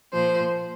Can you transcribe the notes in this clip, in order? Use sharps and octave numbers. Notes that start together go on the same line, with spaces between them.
A#2 F3 C5